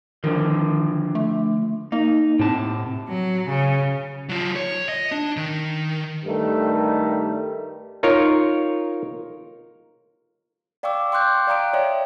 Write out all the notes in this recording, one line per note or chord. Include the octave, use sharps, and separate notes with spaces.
D3 D#3 F3
A3
A#3 D#4
A2 C3 A5
F#3
C#3
F#3 F4
C#5
D#5
D4
D#3
G2 D#3 G3 A3
D#4 F4 A#4 C#5
D5 F5 G5 C#6 D6 E6
G5 C6 D6 F#6 G6
D5 F5 G5 A#5 D#6 D7
C#5 D5 E5 G5